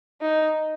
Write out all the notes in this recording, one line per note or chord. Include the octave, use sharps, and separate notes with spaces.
D#4